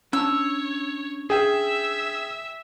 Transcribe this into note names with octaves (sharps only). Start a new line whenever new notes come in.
C#4 D4 C#5 A5 E6
G#4 E5 G5